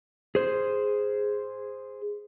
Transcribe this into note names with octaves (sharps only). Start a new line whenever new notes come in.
G#4 C5